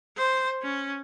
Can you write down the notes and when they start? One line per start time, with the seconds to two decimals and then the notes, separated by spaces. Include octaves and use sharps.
0.17 C5
0.62 C#4